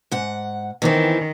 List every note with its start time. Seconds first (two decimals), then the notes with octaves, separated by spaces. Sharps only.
0.12 G#2 F#5
0.82 D#3 E3 B3 C4